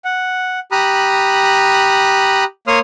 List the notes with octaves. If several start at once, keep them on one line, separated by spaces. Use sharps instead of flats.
F#5
G4 A#5 B5 D#6 F#6
A#3 C#5 C6 D#6 F6